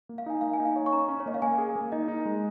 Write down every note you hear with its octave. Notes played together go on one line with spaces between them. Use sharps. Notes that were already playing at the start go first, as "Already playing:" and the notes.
A#3
F5
D#4 G#5
A#3 F5
G#5
D#4
F5
C#5
C#6
C#4 A#5
C#4
C#5
A#3 D#5
F5
A#3 G#5
G#4
A#3
D#4 D#5
D#4
G#3